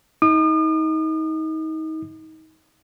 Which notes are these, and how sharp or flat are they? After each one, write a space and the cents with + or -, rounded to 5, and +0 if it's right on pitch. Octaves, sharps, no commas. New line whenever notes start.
D#4 +30 D#6 -40